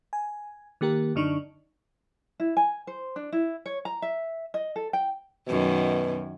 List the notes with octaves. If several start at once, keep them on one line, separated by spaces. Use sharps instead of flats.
G#5
D#3 A#3 G4 A#4
F#2 D3 D4 D#4 C#6
E4
G#5
C5
D4
E4
C#5
A#5
E5
D#5
A4
G5
F#2 B2 D#3